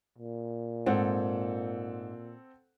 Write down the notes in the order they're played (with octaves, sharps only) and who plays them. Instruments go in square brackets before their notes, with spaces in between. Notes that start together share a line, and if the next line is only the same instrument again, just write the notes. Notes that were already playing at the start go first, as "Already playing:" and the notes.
[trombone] A#2
[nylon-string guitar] G#2 [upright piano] C4 A4 F#5